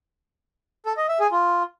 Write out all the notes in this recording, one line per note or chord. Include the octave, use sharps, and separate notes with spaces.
A4
D#5
E5
G#4
F4